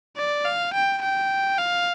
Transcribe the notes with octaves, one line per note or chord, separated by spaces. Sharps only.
D5
F5
G5
G5
F5